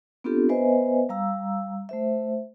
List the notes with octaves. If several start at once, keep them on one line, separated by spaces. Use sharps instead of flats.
B3 C4 D4 F4 G4 A4
B3 B4 C5 D#5 E5 G#5
G3 F5 A#5 E6
A3 C5 E5